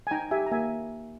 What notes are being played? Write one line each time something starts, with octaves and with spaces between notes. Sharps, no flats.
G#5
D#4 G5 A#5
G4 E5 G#5
A#5
A#3 E5 G#5